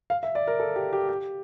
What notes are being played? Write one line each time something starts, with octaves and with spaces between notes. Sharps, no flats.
F5
E5
D5
A#4
A4
G4
G4
G4